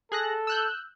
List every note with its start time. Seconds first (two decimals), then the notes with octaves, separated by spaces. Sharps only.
0.12 G#4 A4 F#6 A#6
0.47 E6 F#6 G6